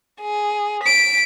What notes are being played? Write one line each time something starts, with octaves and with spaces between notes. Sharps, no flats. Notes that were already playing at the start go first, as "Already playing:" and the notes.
G#4
B6 D7